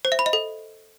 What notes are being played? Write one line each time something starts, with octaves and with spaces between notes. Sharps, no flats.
C5
E5
B5
D#5
A4